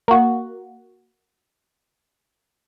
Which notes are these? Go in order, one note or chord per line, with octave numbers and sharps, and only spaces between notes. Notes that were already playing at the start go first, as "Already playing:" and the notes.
A#3 F#4